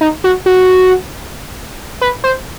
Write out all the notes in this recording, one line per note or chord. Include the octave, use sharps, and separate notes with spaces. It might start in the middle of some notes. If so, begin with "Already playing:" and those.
D#4
F#4
F#4
B4
C5